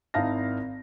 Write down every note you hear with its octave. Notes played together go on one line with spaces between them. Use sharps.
G#1 D#4 E4 F5 A5 A#6